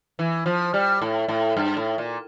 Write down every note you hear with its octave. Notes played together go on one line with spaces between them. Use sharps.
E3
F3
G3
A2
A2
G2
A2
A#2